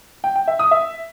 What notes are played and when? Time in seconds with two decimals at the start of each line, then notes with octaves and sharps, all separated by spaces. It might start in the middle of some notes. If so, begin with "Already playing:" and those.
0.24 G5
0.36 G5
0.48 E5
0.59 D#6
0.71 E5